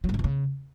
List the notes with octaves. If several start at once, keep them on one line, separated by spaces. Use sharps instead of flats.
F#3
G#2
C#3
E2
C#3